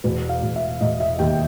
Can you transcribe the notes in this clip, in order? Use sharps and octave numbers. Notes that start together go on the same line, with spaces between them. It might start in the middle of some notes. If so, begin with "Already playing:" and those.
E1 B4
F5
E1
E5
E1 D#5
E5
D#2 G5